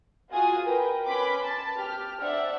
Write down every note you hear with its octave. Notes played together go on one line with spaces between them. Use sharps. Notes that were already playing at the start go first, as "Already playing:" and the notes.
F4 F#4 G#4 G#5 D#6
A#4 B4 G5
C#4 B4 B5 C6 D6 B6
A5
G4 F6
D4 C5 D5 E5 F#5